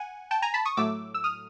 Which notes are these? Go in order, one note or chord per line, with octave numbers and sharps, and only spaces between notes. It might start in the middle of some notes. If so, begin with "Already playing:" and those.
Already playing: F#5 G#5
G5 A5
G#5 A#5
A5 B5
C#6 D#6
A2 F#3 A3 D6 E6
E6
D#6 F6